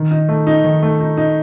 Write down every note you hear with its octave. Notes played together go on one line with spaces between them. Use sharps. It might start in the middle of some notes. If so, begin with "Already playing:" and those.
Already playing: D#3
D#4
A3
D#4
D#3
A3
D#4
D#4